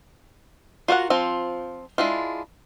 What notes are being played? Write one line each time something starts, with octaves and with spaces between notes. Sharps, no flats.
F4 F#4 A#4 F#5
F3 C4 F4
G#3 D4 E4 F4